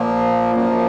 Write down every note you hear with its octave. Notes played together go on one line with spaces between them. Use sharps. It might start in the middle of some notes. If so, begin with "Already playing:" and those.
Already playing: A#2 F3 A#3
F#2 F3 A#3